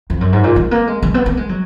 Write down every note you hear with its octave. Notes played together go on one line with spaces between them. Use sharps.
F2
F#2
G#2
A#2
G#3
A#3
G#3
G#3
B3
A#3
G#3
F#3